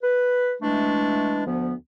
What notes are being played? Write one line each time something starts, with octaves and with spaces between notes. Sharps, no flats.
B4
E3 G#3 A3 D4
D2 F3 B3